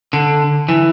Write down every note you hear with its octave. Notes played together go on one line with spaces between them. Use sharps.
D3
E3